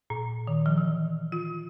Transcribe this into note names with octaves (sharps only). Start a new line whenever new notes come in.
A#2
D#3
F3
E3
F4